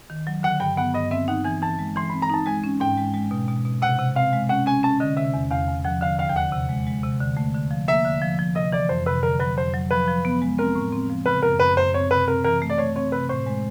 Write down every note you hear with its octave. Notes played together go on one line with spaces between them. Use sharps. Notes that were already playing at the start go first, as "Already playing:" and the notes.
D#3
F#3
D3 F#5
G2 G5
B3 F#5
G2 D#5
C4 E5
D#4 F#5
E3 G#5
E3 A5
G#3
E3 C6
C4 B5
A#5
D#4 A5
G#3 G#5
C#4
G#2 G5
G#3
G#3
B2
B2
B2
C3 F#5
C3
C4 F5
G#3
C#4 F#5
C#4 G#5
C#4 A5
D3 D#5
C3 E5
E2
E2 F5
E2
F3 F#5
D3 F5
D#2 F5
G5
D3 F#5
C3
G#3
G#3
C3
D3
A3
D3
F3
A#3 E5
D3
F3
F3
C3 D#5
E3 D5
F2 C5
C3 B4
D3 A#4
F#3 B4
F2 C5
F#3
F3 B4
F3
B3
G#3
C4 A#4
A2
C4
F3
C#3 B4
F#2 A#4
F#2 B4
F#2 C5
C4 C#5
C3 B4
C4 A#4
E3 A#4
A3
D5
A3 C#5
C4 C#5
C3 B4
A2 C5
G#3